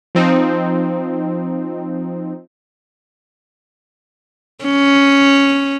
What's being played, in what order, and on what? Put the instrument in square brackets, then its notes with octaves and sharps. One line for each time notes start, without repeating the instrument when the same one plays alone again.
[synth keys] F3 C4 D#4
[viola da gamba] C#4